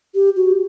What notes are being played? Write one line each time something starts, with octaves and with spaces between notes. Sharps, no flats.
G4
F#4